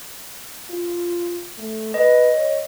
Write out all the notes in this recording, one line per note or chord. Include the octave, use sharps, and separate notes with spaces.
F4
A3
B4 D#5
C#5